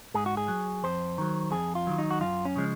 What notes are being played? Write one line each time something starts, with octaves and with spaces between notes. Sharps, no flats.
G#2 G#4
F#4
G#4
F#3
F2 C5
D#3 F#3
F2 G#4
F4
D#3 F#3
D#4
F#4
F#2 F4
C#4
C#3 F3 G#3